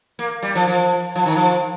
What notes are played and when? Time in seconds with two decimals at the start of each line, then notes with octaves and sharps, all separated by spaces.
0.19 A#3
0.43 G3
0.55 F3
0.67 F3
1.15 F3
1.26 D#3
1.36 F3